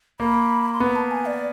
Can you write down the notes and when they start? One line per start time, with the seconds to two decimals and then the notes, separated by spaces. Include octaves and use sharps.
0.20 A#3 B5
0.73 C6
0.80 B3 B5
0.95 A5
1.11 G#5
1.26 D5